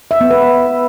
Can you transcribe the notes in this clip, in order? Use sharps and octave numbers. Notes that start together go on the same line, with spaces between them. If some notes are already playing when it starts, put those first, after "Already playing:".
E5
B3
B4